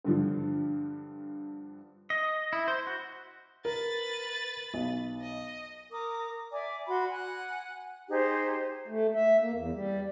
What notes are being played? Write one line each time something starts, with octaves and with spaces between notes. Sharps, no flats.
G2 D3 F3
D#5
E4
C5
F#4
A#4 B4 A6
B1
D#5
A#4 D6 D#6
D5 E5 G#5 D6
F#4 B5 C6
F#5 G#5 F#6
D#4 G4 G#4 C5
A3
E5
A#3
E2
G3